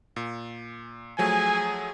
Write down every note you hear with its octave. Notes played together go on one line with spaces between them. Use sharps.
A#2
F3 F#3 A3 G#4 G#5